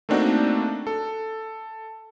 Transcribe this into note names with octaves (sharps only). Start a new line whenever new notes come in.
A3 A#3 C4 D4 D#4 F#4
A4